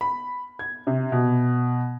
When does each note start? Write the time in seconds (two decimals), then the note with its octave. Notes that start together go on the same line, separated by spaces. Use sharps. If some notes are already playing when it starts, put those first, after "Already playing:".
0.01 B5
0.59 G#6
0.87 C3
1.12 B2